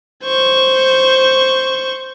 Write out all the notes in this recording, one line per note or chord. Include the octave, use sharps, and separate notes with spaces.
C5 C#6